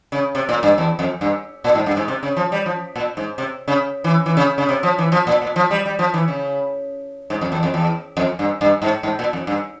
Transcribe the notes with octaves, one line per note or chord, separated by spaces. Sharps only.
C#3
C3
A#2
G2
E2
F2
G2
A#2
G#2
G2
G#2
C3
C#3
F3
G3
F3
A#2
G#2
C3
C#3
E3
E3
C#3
C#3
C3
F3
E3
F3
A#2
A#2
F3
G3
G3
F3
E3
C#3
G#2
F2
E2
F2
E2
F2
G2
G2
G#2
G#2
A#2
F2
G2